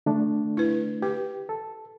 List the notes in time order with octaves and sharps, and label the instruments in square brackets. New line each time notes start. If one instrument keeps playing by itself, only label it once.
[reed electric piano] D3 A3 D4
[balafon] E4 B4
[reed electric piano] G4 [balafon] B4
[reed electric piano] A4